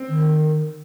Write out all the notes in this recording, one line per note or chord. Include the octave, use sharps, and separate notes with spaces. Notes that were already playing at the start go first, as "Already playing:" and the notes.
Already playing: C4
D#3